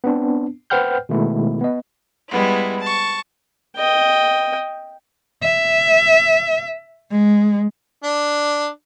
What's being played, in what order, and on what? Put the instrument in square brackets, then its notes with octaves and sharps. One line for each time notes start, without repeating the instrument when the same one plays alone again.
[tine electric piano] B3 C4 D4
B4 C5 F#5 G5 F6 G6
B2 D#3 G#3 A3 B3 E4
B3 D#5
[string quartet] G3 G#3 B3 E4
A5 C#6
[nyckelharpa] D#5 G5
[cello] E5
G#3
[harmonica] D4